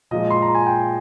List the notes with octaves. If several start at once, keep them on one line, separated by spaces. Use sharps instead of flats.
A#2 F3 G#3 D#5
C6
A#5
G#5
G5